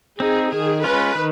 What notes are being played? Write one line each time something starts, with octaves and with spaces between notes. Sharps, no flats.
C4 D#4 G#4
D#3 G#4
G#3 C#4 F4 B4
D#3